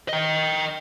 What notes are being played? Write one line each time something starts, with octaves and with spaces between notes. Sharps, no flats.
D#5 G5